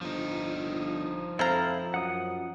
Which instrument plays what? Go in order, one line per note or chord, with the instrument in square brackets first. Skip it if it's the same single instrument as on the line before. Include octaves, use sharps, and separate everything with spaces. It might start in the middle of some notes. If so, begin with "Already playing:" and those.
[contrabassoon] G1 [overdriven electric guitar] F3 D#4
[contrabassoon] F2 [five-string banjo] C4 A#5 [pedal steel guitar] E4 A4 F5
[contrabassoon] F#2 [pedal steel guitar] F#5 D#6